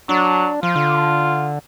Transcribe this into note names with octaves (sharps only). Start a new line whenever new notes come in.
F#3 D4
F3 F4
D3